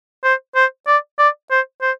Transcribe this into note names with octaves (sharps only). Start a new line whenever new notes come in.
C5
C5
D5
D5
C5
C5